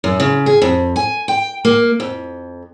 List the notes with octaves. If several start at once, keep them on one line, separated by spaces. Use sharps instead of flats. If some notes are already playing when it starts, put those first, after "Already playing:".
F#2
C#3
G#4
F2
G#5
G5
A#3
F2